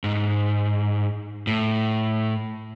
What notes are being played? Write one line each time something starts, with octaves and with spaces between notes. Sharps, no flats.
G#2
A2